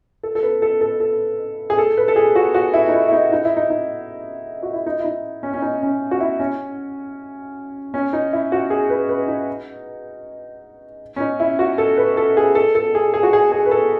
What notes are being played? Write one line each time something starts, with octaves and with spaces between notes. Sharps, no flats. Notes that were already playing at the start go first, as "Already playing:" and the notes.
A4
A4
B4
A4
A4
A4
G#4
A4
B4
A4
G#4
F#4
F#4
E4
D#4
E4
E4
D#4
D#4
E4
D#4
D#4
F#4
E4
D#4
E4
D#4
C#4
C#4
D#4
C#4
F#4
E4
C#4
C#4
D#4
E4
F#4
G#4
B4
B4
D#4
C#4
D#4
E4
F#4
A4
B4
A4
G#4
A4
A4
G#4
G#4
F#4
G#4
G#4
B4
A4